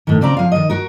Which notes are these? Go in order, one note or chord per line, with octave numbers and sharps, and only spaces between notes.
A2 D#3
C#3 C4 D5 A#5
F3 F5
D#3 D#5
F#4 A#4